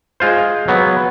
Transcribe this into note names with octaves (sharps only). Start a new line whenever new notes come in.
G#3 F4 C5
F#3 B3